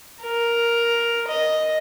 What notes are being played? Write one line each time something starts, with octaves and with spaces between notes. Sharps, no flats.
A#4
D#5